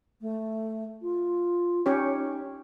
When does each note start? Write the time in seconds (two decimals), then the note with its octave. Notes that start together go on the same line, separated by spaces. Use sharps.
0.21 A3
1.02 F4
1.86 C#4 D#4 G4 C#5